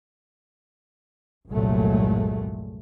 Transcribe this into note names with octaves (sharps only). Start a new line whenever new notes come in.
G1 C2 A#2 F#3 G#3 A3